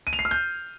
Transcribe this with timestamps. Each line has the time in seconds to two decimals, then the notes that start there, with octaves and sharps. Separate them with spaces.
0.07 D#7
0.13 F7
0.19 C7
0.25 F6
0.31 G6